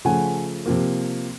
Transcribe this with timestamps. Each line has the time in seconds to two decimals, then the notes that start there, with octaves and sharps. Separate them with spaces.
0.05 C#3 F3 A3 F#5 G#5
0.66 C3 F3 A#3